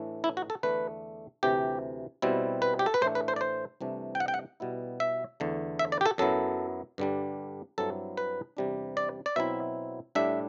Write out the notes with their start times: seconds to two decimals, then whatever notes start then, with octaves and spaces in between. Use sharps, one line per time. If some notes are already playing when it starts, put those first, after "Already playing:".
Already playing: A2 E3 A3 D4
0.24 E4
0.37 F#4
0.50 A4
0.63 E2 D3 A3 D4 B4
1.43 D2 C3 E3 G4
2.22 B2 G3 C4 E4
2.62 B4
2.79 G4
2.86 A4
2.94 B4
3.01 A2 E3 A3 D4 C5
3.15 B4
3.28 C5
3.36 D5
3.41 C5
3.81 C2 C3 E3 A3 D4
4.15 G5
4.20 F#5
4.28 G5
4.34 F#5
4.60 B2 G3 B3 E4
5.00 E5
5.40 E2 D3 A3
5.79 E5
5.92 D5
6.01 G4
6.06 A4
6.18 F#2 F#3 B3 E4 A4
6.98 G2 D3 G3 D4
7.78 G2 F#3 C4 E4 A4
8.17 B4
8.57 E2 C3 G3 D4
8.97 D5
9.26 D5
9.36 B2 F#3 C4 E4 E5
10.15 A2 G3 D4 E5